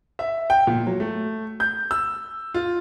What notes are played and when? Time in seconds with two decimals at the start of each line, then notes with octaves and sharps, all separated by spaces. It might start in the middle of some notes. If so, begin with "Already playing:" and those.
0.19 E5
0.50 G5
0.67 A#2
0.86 F#3
1.00 A3
1.60 G6
1.91 E6
2.54 F4